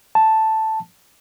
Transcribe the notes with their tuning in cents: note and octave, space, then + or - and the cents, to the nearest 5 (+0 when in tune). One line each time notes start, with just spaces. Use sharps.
A5 +0